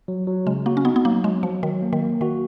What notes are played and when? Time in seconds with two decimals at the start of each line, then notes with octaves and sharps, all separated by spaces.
0.08 F#3
0.27 F#3
0.46 C#3 G#3
0.66 A#3 F#4
0.77 C#4
0.85 B3 D#4
0.96 B3
1.05 F#3 A#3
1.24 F#3 G#3
1.43 F3 F#3
1.63 D#3 F#3
1.82 A#3
1.93 D#3
2.02 A#3
2.21 D#3 F#4